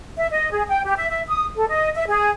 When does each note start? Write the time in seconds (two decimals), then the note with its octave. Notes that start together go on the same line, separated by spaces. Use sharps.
0.17 E5
0.30 D#5
0.51 G#4
0.69 G5
0.84 G4
0.96 E5
1.09 E5
1.28 D#6
1.56 A4
1.69 D#5
1.95 E5
2.08 G#4